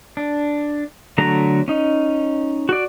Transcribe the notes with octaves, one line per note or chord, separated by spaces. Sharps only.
D4
D3 F#3 A3 A#5
C#4 D#4
F#4 D5